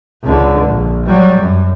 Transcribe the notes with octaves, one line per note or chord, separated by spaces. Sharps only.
C#2 D3
A#1
F#3 G3
F#2